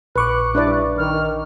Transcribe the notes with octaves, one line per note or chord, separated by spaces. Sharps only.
A#1 B4 C#6 D6 F#6
G2 D4 E4 B4 D5
D#3 F6